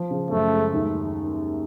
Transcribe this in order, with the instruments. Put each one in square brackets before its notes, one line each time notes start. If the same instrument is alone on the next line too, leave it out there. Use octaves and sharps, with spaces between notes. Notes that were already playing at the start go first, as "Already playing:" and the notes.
Already playing: [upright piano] F3
C#3
[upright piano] F#2 [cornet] A3
[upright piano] G#3
D#2